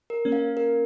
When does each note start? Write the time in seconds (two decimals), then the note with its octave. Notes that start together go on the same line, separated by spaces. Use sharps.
0.10 A#4
0.25 A#3 C#4
0.32 F5
0.57 A#4